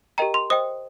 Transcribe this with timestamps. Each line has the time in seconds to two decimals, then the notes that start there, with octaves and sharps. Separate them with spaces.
0.18 G4 A#4 D#5 G5 A#5
0.34 C6
0.50 C5 D#5 G5 D#6